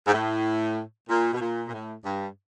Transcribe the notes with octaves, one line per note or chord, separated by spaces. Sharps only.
G#2
A2
A#2
B2
A#2
A#2
A2
G2